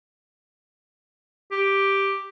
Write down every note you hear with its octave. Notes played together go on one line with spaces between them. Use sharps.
G4